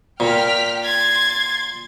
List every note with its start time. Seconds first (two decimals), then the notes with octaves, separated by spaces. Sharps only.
0.20 A#2 G5 F6 B6
0.85 C6 G#6 A6